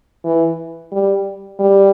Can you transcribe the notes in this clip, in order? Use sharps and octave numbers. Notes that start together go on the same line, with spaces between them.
E3
G3
G3